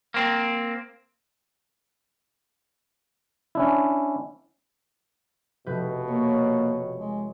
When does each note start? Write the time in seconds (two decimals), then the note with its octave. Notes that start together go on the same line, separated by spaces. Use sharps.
0.14 A#3 C4
3.55 C#4 D4 E4
5.66 F1 B2 B4 G6
6.08 A#3 C#5 E5
6.43 D#5
6.97 G#3